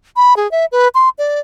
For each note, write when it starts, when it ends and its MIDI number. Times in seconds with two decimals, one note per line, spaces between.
0.16 0.36 83
0.37 0.50 68
0.51 0.65 76
0.72 0.88 71
0.95 1.09 84
1.18 1.40 74